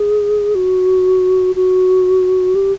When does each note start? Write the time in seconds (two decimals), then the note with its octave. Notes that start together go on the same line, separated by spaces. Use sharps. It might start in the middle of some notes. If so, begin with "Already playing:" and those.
Already playing: G#4
0.55 F#4
1.56 F#4
2.55 G4